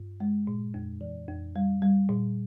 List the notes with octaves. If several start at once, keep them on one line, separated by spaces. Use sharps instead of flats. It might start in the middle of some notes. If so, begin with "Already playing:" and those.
Already playing: G2
G#3
A#2
F2
E3
F2
G3
G3
A#2